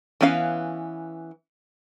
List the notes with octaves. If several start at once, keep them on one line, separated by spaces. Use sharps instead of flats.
E3 B3 C#4 F5